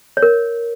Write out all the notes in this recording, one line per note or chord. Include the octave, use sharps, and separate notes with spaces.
C#5
A#4